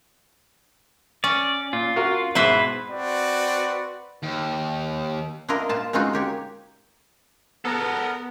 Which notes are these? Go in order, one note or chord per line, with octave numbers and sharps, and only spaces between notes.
C#4 D5
A#2 F4
F#4 A#4 F5
G#2 B2 E4 B4 C5 E5
C4 F#4 B4 D5
D#2
D4 E4 F4 A#4 D#5
A#2 F4 A5
G#3 C4 C#4 D#4 F4 F#4
A#3 G4 C#5
B3 A4 A#4